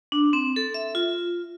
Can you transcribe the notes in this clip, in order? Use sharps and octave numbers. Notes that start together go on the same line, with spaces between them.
D4
C4
A4
E5
F4